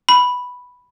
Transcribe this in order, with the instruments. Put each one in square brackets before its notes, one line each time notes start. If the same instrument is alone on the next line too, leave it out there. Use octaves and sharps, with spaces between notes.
[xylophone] B5